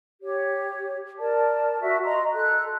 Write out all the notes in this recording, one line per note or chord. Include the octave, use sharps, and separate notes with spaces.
G4 C#5
A#4 D5 A5
F#4 E5
D#5 A#5 C6
A4 F#6